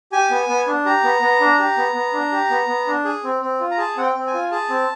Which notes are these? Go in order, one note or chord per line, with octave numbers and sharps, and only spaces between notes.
G4 G#5
B3
B3
D4
G4 A#5
B3
B3
D4
G4
B3
B3
D4
G4
B3
B3
D4
G#4
C4
C4
F4
A#5
G#4 A5
C4 F#5
G5
C4
G#5
F4
G#4 A5
C4